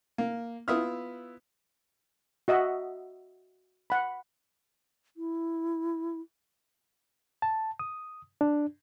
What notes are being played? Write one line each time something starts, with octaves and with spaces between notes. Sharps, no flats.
A#3
B3 E4 F4 E5 D#6 F6
F#4 D#5 E5 F#5
F#5 B5
E4
A5
D#6
D4